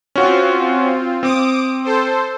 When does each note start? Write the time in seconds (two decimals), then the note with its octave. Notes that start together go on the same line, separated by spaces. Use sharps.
0.15 C4 C#4 F4 F#4
1.23 C4 D6 D#6 D7
1.84 A4 C5